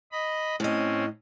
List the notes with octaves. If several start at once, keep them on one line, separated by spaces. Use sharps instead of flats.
D#5 B5
A2 C4 C#4 D#5